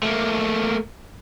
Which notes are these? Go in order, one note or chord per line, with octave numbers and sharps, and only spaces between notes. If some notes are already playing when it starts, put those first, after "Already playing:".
A3 A#3